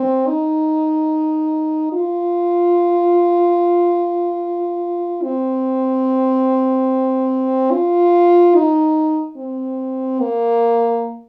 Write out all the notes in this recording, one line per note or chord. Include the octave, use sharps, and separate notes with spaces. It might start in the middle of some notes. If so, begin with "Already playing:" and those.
Already playing: C4
D#4
F4
C4
F4
D#4
C4
A#3